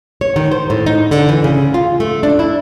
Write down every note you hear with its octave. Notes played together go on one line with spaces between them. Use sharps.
C#5
D#3
C5
A2
D#4
D3
E3
C#3
F4
A3
D4
E4